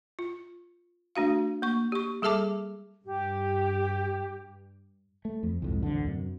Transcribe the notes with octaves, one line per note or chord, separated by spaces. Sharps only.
F4
A3 D4 F#4 F5
A#3 C#6
G4 C#6
G3 G#4 A4 E5 A5 D6
G2 G4
A3
F2
C2 F2 G#2
A1 D2 D3
F#2 C3